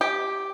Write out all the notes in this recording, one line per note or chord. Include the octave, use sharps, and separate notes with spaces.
G4